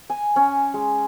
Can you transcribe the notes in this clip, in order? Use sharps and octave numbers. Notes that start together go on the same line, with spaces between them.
G#5
C#4
G#3